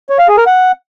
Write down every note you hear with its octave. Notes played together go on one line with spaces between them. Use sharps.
C#5
F5
G#4
A#4
F#5